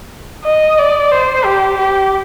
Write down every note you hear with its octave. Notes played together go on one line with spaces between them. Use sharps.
D#5
D5
C5
G4
G4